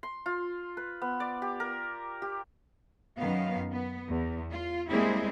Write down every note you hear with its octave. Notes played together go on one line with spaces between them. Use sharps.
C6
F4
B4
B3
D5
G4
A#4
G4
F#2 D#3 B3 F5
B3
E2
F4
G3 G#3 A#3 C4 E4 G#4